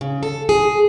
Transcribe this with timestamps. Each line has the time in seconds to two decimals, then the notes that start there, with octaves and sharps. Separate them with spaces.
0.01 C#3
0.23 A4
0.49 G#4